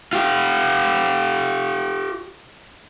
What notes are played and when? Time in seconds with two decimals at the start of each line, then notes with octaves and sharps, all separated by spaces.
0.13 F4 G4